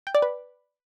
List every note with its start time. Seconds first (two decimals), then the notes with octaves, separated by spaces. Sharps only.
0.07 G5
0.15 D5
0.22 B4